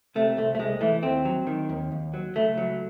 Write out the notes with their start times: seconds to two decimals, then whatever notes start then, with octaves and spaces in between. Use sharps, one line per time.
0.15 C3 A3
0.37 C2 A3
0.55 A3
0.59 C2 G#3
0.81 E3 A3
1.03 D#2 C4
1.25 F#3
1.47 D#3
1.69 D#2
1.92 D#2
2.14 F#3
2.35 C#2 A3
2.57 F#3